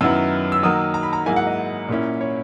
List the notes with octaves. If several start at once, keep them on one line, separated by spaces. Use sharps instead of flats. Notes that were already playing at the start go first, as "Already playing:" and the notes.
F#2 D#3 F#3 B3 E4 E6
E6
D#3 F#3 A#3 D#6
A#5
B5
A#5
G#2 F#3 A#3 E4 G#5
F#5
D#5
A#2 A#3 C#4 E4
C#5